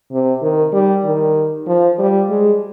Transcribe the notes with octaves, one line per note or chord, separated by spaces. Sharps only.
C3
D#3
G3
D#3
F3
G3
G#3